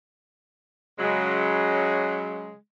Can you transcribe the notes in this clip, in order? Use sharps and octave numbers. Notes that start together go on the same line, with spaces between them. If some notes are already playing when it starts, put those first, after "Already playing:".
C#3 F#3 G#3